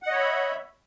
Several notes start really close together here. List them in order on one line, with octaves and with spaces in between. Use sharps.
F#5 D#5 C#5 B5 E5